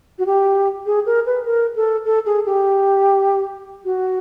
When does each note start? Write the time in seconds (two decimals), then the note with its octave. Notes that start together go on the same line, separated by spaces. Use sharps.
0.19 F#4
0.26 G4
0.86 G#4
1.06 A#4
1.26 B4
1.46 A#4
1.76 A4
2.05 A4
2.26 G#4
2.46 G4
3.85 F#4